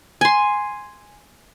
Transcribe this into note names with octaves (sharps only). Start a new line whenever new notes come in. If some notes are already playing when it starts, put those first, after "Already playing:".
G#5 C6